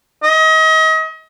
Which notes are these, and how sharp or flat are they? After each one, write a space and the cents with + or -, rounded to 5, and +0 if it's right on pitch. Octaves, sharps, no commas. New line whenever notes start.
D#5 +35